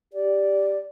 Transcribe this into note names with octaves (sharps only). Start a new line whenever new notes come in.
G4 D5